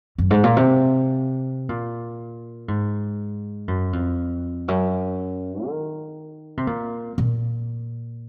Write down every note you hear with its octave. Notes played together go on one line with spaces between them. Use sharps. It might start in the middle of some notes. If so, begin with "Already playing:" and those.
F#2
G#2
A#2
C3
A#2
G#2
F#2
F2
F#2
D#3
C3
A#2
A#2